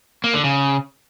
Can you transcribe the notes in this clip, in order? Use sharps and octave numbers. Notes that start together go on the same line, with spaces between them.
A#3
D3
C#3